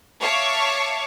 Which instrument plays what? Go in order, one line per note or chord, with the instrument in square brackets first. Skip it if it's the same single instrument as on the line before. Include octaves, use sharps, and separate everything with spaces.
[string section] C#5 E5 F5 A5 C#6 D6